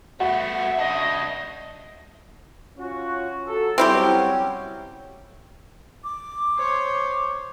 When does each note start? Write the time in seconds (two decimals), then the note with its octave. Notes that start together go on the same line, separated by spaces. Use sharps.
0.20 A3 B3 F#4 E5
0.79 C#3 D4 D#5
2.78 C#4 F4 F#4
3.47 F#3 A4
3.78 F#3 G3 C4 C#4 E4 G4
6.04 D6
6.57 C5 C#5